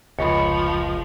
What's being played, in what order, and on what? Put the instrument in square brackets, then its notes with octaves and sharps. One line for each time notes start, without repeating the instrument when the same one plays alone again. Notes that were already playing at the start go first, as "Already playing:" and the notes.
[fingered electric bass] F1 [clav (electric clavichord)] C#2 [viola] F3 [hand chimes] B5 C#6 C#7